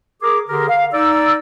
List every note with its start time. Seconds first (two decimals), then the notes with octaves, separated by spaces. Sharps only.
0.22 G#4 A#4 D6
0.48 D3 G4 G#4 A#4
0.69 F5
0.93 D#4 D5 E6